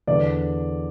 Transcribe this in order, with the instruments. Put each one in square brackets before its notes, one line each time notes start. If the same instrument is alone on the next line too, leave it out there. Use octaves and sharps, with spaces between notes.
[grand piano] E2 D3 D5